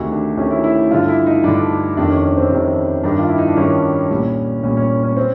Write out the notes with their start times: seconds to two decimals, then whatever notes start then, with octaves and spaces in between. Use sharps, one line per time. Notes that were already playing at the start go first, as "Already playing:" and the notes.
Already playing: D2 C3 D#3 F#4
0.11 D4
0.37 D2 C3 D#3 C#4
0.51 E4
0.64 E4
0.91 G2 D3 F4
1.08 E4
1.26 D#4
1.44 G2 D3 D4
1.97 F2 C3 D#3 D4
2.10 C#4
2.24 C#4
2.37 C4
2.50 F2 C3 D#3 D4
3.04 G2 D#3 D4
3.19 F4
3.28 E4
3.38 D#4
3.47 D4
3.56 G2 D#3 C#4
4.10 C2 A#2
4.63 C2 A#2 C#4
4.77 C#4
5.04 C#4
5.16 C4